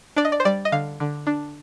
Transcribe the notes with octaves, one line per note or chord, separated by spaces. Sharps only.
D4 D5
D#5
D5
C5
G3 D5
D#5
D3 F5
D3
D4